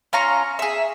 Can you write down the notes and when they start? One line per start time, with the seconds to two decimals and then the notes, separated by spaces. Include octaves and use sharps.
0.13 C#4 F4 A#5 C#6
0.59 G#4 E5